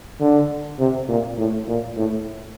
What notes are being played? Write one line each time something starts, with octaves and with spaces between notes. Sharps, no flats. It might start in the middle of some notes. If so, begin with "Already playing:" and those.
D3
C3
A#2
A2
A#2
A2